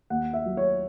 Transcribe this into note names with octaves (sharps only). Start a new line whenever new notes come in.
D#2 F#5
E5
F#3
C#5